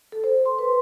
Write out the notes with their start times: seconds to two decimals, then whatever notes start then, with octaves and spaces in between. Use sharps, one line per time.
0.12 A4
0.24 C5
0.46 C6
0.59 B4